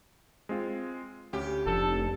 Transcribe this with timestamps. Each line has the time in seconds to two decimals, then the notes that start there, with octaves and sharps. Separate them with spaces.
0.49 G#3 C4 F4
1.33 D2 C#4 G4
1.66 F1 F3 D4 A4 E7